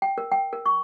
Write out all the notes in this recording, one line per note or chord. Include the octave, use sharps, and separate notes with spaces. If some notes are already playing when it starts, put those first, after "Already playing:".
G5
A#4
G5
A#4
C#6